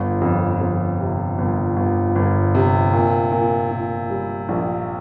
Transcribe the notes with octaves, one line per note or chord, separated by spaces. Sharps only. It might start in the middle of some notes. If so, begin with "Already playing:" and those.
Already playing: G1
F2
F2
C3
G1
G1
G1
C3
A#2
A#2
A#2
G3
A#1